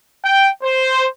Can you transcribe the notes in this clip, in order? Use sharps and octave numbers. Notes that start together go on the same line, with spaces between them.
G5
C5